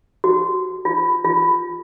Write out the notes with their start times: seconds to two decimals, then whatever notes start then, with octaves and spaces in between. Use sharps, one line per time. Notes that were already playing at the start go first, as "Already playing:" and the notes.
0.24 F#4
0.85 F4
1.24 F4